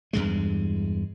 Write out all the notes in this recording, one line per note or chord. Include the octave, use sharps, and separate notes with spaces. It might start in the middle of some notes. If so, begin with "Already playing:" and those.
E2 G2 G#3